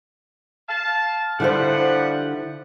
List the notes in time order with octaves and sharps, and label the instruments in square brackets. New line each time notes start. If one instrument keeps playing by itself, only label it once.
[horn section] F5 A5
[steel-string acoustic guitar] D3 E4 C5 [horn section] F3 G3 F#5